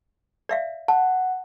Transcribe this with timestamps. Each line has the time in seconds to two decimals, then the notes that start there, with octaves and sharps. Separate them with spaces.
0.49 D5 E5 F5
0.88 F#5 A5